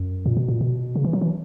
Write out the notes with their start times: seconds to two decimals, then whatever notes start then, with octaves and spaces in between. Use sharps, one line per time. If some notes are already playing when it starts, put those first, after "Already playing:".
Already playing: F#2
0.26 A#2
0.37 B2
0.48 A#2
0.61 B2
0.96 C#3
1.04 E3
1.13 F#3
1.21 E3